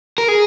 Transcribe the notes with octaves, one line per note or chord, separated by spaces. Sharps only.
A#4
G#4